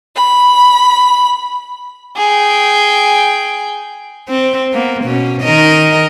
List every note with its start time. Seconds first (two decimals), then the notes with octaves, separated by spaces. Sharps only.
0.15 B5
2.17 G#4 G5
4.29 C4
4.73 A#3 B3
5.04 B2 C#4
5.44 D#3 A#4 D#5